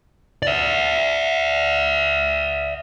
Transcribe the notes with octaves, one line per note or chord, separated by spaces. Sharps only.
D5 E5